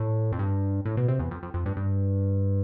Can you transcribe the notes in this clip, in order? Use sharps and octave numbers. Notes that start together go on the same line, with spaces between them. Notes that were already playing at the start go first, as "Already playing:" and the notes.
Already playing: A2
F2
G2
A2
B2
C3
E2
F2
F2
F2
G2
G2